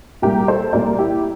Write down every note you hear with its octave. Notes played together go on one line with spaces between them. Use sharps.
C2 A#2 G3 G4 A#4
A4 C5
C2 A#2 G3 A#4 D5
E4 G4